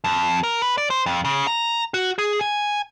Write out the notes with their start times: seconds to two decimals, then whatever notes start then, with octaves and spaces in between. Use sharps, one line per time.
0.04 F2
0.43 A#4
0.62 B4
0.78 D5
0.90 C5
1.06 F2
1.25 C#3
1.47 A#5
1.94 F#4
2.19 G#4
2.41 G#5